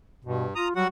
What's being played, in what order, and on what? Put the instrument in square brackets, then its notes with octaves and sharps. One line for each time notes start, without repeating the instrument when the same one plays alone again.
[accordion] G2 [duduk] B2
[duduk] F4 [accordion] A#5 D#6
[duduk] F#3 [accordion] G3 F#4 F#5